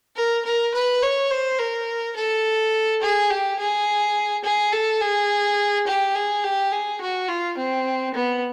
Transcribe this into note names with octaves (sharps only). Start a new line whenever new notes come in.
A#4
A#4
B4
C#5
C5
A#4
A4
G#4
G4
G#4
G#4
A4
G#4
G4
G#4
G4
G#4
F#4
F4
C4
B3